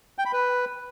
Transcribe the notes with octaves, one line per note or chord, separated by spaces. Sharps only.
G5
B5
B4